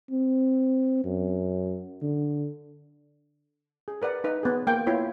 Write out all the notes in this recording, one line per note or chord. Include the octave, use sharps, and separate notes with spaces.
C4
F#2
D3
G#4
A#4 B4 D5 F#5
D#4 B4
B3 G#4
A#3 G5
B3 E4 F4 C#5 G5